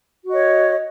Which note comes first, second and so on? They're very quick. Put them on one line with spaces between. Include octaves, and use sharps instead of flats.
F#4 D#5 C#5